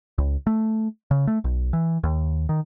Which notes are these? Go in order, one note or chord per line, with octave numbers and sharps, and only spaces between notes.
C#2
A3
C#3
A3
B1
E3
D#2
D#3